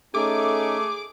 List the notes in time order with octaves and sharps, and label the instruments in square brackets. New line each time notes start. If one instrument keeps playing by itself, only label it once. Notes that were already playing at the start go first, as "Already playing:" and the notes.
[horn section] A3 [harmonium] C#4 D#4 [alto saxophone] G#4 [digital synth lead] D6